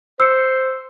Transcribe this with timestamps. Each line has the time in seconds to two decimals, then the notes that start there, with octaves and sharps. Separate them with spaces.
0.20 C5 E6 C#7